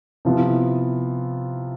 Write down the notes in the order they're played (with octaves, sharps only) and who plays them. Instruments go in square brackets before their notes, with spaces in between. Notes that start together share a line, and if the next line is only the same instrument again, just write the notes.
[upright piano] C3 F3 B3 E4